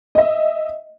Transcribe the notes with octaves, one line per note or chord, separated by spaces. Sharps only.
D#5 E5